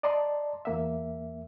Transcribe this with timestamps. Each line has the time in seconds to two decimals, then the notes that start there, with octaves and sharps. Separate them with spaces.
0.03 D5 D#5 A5 A#5 C6
0.65 E2 A#3 E5